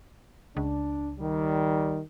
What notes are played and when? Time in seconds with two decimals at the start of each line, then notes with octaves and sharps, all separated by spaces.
0.57 C#2 D4
1.19 D#3 G3